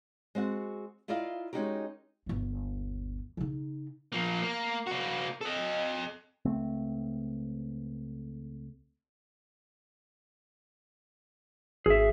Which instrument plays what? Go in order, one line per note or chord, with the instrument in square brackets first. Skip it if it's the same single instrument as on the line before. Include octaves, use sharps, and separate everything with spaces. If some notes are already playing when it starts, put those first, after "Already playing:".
[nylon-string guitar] G#3 C4 F#4 F#5
E4 F4 A#4 D5 D#5 F5
G#3 C#4 D#4 F#4 G4 A#4
[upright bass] G1 D#2
C#3 D#4
[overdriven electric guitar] F3 A#3
A#3
A#3 F#4
A4 D#5
[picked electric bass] C#2 A3 C4
[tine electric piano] G#1 [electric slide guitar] G#4 E5